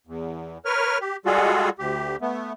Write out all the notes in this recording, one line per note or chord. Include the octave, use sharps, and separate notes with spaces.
E2
A#4 B4 C#5 F6
G4
G3 G#3 F4 F#4 G#4 A4
D2 G4
A3 B3